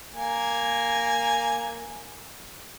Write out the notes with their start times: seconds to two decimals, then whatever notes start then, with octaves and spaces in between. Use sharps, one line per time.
0.15 A#3 G#5